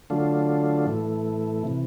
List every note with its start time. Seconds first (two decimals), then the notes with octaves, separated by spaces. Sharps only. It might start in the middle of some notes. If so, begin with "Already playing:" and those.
0.10 D3 F#3 A3 D4 F4
0.86 A2 E3 A3
1.65 C3 E3